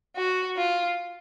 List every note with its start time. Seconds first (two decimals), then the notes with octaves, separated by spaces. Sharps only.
0.16 F#4
0.56 F4